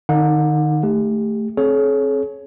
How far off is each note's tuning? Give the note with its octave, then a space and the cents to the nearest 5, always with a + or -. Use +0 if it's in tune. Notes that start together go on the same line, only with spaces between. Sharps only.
D#3 -40 D#4 +0 F#5 -40
A3 +0 G4 +25
C4 +30 G#4 +45 C#5 +0